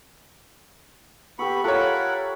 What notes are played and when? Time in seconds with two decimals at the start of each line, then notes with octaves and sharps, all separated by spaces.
1.39 B3 G4 A4 B5 C#6
1.64 F4 A4 A#4 C#5 E5 F#5 B5